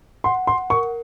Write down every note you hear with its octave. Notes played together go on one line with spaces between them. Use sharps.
F#5 C6
C6
A#4 C#6